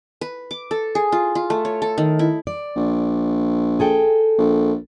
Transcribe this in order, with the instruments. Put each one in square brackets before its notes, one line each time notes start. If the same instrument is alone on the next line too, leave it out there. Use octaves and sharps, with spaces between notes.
[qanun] B4
D6
A4
G#4
F4
F4
A3
C#5
A4
D#3
E4
[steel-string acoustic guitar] D5
[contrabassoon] A#1
[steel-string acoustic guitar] G#4 A4 G5
[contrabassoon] A#1